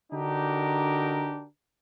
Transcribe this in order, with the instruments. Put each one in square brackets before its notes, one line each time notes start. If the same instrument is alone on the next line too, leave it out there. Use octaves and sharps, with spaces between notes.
[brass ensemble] D3 D4 D#4 F#4 G4 A#4